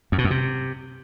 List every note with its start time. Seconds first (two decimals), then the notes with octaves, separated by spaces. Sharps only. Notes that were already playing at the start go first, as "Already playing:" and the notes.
0.12 F#2
0.18 B2
0.24 F#2
0.30 C3